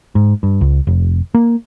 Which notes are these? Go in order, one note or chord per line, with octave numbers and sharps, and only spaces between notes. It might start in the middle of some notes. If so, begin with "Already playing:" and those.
G#2
G2
C#2
F1
A#3